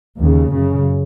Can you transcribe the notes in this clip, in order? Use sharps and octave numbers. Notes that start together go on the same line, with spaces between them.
D#2 C#3
F#2 C#3